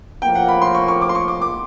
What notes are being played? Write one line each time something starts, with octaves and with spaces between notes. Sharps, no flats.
A2 F3 A#3 G5
F#5
B5
C6
C#6
C#6
D6
C6
C#6
D6
D6